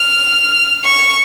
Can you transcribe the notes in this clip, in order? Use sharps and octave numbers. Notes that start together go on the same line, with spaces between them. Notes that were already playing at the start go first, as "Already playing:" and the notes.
Already playing: F6
C#6